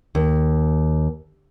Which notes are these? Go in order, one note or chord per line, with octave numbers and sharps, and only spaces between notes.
D#2